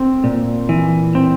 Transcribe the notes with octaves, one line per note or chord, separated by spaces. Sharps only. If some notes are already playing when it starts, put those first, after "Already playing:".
Already playing: C4 A4
A#2
E3
C4